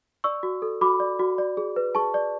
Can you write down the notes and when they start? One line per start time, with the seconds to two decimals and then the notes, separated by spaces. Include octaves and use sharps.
0.24 D5 C#6 E6
0.43 F#4
0.62 A4
0.81 F#4 B5 D6
1.00 D5
1.19 F#4
1.38 D5
1.57 G#4
1.76 B4
1.95 G#4 A5 C#6
2.14 D5